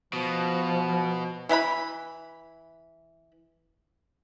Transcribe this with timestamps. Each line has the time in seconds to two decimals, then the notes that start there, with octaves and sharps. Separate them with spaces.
0.13 B2 F3
1.49 E3 E4 F#5 B5